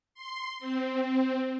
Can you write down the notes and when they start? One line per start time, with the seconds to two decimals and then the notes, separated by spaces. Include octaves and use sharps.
0.14 C6
0.59 C4